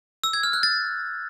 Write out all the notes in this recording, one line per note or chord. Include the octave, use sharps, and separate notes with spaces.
E6
G#6
F6
F#6
A6